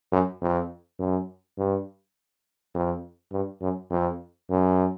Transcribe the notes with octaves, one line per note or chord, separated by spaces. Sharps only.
F#2
F2
F#2
G2
F2
G2
F#2
F2
F#2